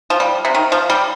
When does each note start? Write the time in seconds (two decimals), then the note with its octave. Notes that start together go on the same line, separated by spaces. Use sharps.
0.10 F3
0.20 G3
0.45 C3
0.55 D#3
0.72 F3
0.90 G3